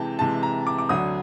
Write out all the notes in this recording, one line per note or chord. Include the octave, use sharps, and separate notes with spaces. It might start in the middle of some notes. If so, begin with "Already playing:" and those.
Already playing: C3 E3 G#3 G5 A5
C3 E3 G#3 A5
A#5
D6
D6
D2 D3 F#3 D#6